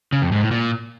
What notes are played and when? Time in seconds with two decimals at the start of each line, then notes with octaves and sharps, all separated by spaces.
0.12 C#3
0.22 F2
0.32 G#2
0.42 A2
0.51 A#2